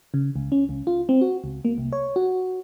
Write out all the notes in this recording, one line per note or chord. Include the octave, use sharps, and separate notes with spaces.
C#3
C#2
C#4
C#2
F4
C4
F#4
C#2
A#3
C2
C#5
F#4